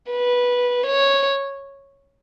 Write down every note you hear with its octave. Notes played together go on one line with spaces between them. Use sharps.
B4
C#5